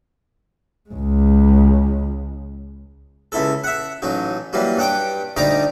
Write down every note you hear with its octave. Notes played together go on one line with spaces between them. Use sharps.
C#2 G#3
C#2 E4 A4
E5 F#5
A1 F#3 D#4
E3 F#3 G3 A#3
G2 F#5 G5 D6
D2 G3 D#4 D5 A#5 D6